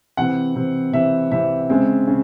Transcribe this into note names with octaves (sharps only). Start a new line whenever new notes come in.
C3 E3 C4 F#5
C3 E3 C4
C3 E3 C4 E5
C3 E3 C4 E5
C#3 G#3 C4
C#3